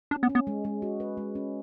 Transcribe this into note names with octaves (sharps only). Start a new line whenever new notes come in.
C#4 D4
B3
C#4
B3
G#3
G#3
F#4
B4
G#3
C#4